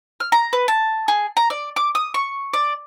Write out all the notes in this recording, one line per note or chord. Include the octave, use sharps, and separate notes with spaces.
F6
A#5
B4
A5
G#4
A#5
D5
D6
D#6
C#6
D5